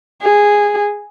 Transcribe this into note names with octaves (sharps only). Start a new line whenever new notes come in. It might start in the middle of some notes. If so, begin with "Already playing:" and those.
G#4